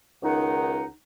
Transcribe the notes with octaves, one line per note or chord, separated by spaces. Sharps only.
C#2 D#3 D#4 F#5